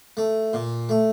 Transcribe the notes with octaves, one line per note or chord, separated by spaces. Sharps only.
A3
A#2
A3